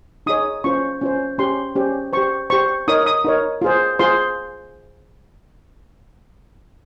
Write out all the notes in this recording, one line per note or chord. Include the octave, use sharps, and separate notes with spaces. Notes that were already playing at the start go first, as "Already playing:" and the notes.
D#4 G#4 C#5 D#6
C#4 F4 C5 C#6
C#4 F4 C5
C#4 G4 C5 C6
C#4 G4 C5
G4 C5 C#6
G4 C5 C#6
D#4 A#4 C#5 D#6
D#6
D#4 A#4 C#5
F4 G#4 C5
F4 G#4 C5 C6